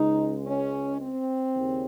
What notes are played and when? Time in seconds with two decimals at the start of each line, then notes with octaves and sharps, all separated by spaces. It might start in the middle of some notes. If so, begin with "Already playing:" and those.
Already playing: C#2 C#3 G#3 D#4
0.46 C#4
1.02 C4
1.56 D#2 C#3